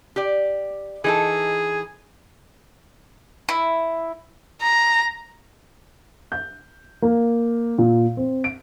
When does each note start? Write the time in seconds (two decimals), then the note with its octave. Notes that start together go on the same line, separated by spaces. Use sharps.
0.16 G4 D5
1.04 E3 D#4 G#4 A4
3.49 E4
4.62 A#5
6.32 G6
7.02 A#3
7.78 A#2
8.17 C4
8.44 D7